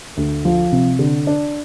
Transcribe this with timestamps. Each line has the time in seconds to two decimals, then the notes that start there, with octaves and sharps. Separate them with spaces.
0.17 D2
0.45 F3
0.72 C3
0.99 D3
1.27 D4